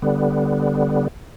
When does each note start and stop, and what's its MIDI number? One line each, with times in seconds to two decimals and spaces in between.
0.02 1.08 50
0.02 1.08 55
0.02 1.08 59